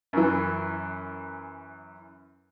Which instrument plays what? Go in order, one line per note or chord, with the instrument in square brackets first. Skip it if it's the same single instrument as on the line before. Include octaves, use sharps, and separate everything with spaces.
[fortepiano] F#2 E3